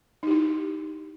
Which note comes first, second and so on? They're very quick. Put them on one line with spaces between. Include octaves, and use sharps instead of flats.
D#4 G4 E4